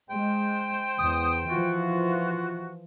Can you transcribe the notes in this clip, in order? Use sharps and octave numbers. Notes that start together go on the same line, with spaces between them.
G#3 C5 G5
E2 D#6
E3 F3 F4 F#4